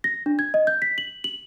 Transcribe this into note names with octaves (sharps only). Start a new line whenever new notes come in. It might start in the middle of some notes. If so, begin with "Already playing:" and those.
A#6
D4
G#6
D#5
G6
B6
F#7
F#7